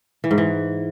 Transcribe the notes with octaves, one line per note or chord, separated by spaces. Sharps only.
E3
G#2
E3